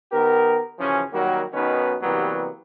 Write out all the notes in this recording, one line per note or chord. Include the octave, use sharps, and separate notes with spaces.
D#3 B3 G4 A#4
F#2 C#3 E3 F3 C#4
D#3 F#3 G3 A#3 F#4 A#4
B1 B2 D#3 C#4 D#4 B4
C3 E3 F#3 G3 A#3 B3